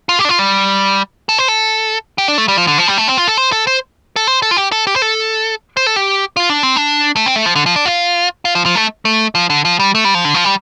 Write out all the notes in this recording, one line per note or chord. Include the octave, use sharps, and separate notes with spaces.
F4
G4
D4
F4
G3
A4
C5
A4
G4
D4
A3
G3
F3
D3
F3
G3
A3
C4
F4
A4
C5
A4
C5
A4
C5
A4
F4
G4
A4
G4
C5
A4
C5
A4
G4
F4
D4
C4
D4
A3
C4
A3
F3
D3
F3
D4
F4
F4
F3
F3
A3
A3
F3
D3
F3
G3
A3
G3
F3
D3
F3
G3